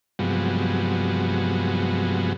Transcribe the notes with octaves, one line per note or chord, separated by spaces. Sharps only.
G2 C3 F3 F#3 G#3 B3